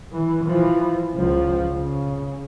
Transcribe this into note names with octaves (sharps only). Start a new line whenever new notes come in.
E3
E3 F3
C#2 F3
C#3